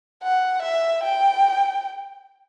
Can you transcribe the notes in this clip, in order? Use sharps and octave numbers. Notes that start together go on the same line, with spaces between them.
F#5
E5
G5